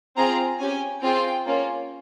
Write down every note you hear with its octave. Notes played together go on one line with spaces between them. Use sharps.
C4 F4 G#4 A#5
C#4 G4 G#5
C4 F4 G#4 G5
A#3 C#4 F4